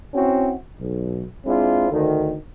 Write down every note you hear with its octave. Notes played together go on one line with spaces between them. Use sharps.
C4 C#4 E4 F#4
B1
G#3 C4 D4 E4 F4
D2 D#3